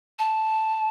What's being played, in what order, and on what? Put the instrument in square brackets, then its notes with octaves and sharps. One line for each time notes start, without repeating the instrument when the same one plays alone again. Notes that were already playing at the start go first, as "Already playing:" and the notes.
[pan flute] A5